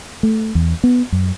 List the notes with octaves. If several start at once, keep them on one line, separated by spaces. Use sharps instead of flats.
A3
E2
B3
F#2